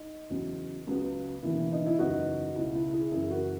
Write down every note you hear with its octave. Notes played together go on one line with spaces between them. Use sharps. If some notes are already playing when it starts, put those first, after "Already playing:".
Already playing: D#4
E2 C#3 F#3 C#4
C#2 C#3 F#3 B3
E1 D#2 C#3 E3 E4
D#4
E4
F#1 E2 C#3 F#3 B3 D#4 F#4
C#2 B2 G#3 E4
E4
E4 G#4
F#1 F#2 E3 E4 G#4
F#4 A#4